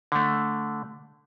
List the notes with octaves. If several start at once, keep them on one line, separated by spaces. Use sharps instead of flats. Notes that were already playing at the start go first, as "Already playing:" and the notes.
D3 A3